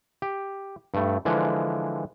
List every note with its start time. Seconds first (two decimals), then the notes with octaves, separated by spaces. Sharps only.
0.22 G4
0.94 G2 A3
1.25 D3 E3 F3 G#3